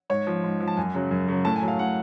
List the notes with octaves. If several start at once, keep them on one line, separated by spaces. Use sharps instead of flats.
G#2 C#5
F3
G#2
F3
A5
F#2 G#5
C#3 F#3
F#2
C#3 F#3
A2 A5
G#5
F#3
F5
A2 F#5